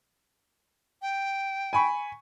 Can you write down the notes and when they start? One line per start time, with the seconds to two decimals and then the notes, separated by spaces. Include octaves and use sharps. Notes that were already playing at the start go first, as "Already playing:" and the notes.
1.02 G5
1.73 G#5 B5 C#6